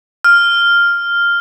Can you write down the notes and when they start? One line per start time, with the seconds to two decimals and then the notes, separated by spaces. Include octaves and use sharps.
0.24 F6